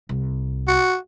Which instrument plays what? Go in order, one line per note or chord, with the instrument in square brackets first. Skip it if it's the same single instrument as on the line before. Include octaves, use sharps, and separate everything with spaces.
[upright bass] C2
[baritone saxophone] F#4